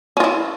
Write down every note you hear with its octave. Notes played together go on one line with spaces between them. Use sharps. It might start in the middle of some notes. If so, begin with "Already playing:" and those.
C#4 E4 F4